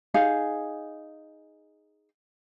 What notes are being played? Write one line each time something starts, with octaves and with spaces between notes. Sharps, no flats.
D#4 G#4 F5